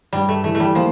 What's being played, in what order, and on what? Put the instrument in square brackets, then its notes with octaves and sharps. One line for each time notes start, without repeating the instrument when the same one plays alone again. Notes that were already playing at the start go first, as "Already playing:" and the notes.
[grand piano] G2 [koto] G3
[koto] A3
[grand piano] E3 [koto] A3
[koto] A3
G3
[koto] F3 [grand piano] A#3